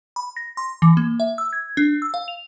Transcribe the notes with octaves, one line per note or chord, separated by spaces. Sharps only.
B5
A#6
C6
E3
A#3
E5
E6
G#6
D4
E6
F5
F7